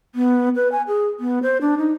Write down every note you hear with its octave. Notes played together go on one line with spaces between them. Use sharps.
B3
B4
G#5
G#4
B3
C5
D4
D#4